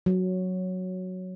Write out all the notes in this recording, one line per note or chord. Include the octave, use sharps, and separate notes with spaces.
F#3